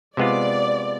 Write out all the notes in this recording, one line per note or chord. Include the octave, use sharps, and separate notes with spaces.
C3 G#3 B3 F4 D5